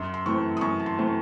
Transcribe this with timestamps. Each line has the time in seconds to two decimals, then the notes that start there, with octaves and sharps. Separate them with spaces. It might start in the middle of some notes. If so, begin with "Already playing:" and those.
Already playing: F#2 C6
0.14 C6
0.26 E3 A3 C4 C#6
0.57 D#6
0.61 F#2 C#6
0.79 A5
0.86 C6
0.98 E3 A3 C4